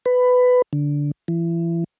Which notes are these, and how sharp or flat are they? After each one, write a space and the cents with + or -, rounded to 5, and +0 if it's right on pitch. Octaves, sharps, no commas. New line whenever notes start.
B4 +15
D3 -10
E3 +30